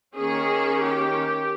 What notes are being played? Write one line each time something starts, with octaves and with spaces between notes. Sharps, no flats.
D#3 A#3 C#4 G#4
G4